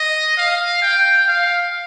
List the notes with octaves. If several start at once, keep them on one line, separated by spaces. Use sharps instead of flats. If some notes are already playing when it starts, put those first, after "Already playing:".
Already playing: D#5
F5
G5
F5